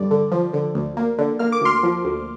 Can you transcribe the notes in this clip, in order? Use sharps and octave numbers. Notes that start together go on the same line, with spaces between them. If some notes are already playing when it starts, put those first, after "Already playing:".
Already playing: G2 D3 D5
D3
F3
D3
D2
A#3
D3
A#3 F6
D6
D2 C6 F6
F3
D2